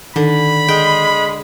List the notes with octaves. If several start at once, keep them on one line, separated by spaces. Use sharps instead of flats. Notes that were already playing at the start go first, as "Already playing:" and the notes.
D3 D#3 B5
G#3 G5